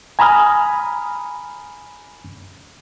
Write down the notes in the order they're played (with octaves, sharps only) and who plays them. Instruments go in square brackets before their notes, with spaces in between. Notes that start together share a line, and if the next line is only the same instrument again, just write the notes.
[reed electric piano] G#5 A#5 B5 D#6 F6